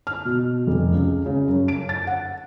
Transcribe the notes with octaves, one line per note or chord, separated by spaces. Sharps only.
F6
B2
F1
C#2
C#3
F#2
D7
A6
F#5